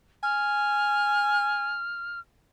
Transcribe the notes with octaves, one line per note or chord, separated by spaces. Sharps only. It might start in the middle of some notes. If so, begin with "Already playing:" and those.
G#5 F6